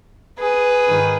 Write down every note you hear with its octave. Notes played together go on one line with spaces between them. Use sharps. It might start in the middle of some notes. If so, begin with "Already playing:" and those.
G#4 B4
G#2 D#3